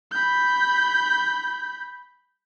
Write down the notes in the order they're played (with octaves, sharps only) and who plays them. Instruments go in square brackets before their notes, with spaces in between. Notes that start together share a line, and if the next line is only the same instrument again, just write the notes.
[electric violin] B5 G6